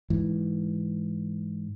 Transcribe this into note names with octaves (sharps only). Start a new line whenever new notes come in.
G#2 E3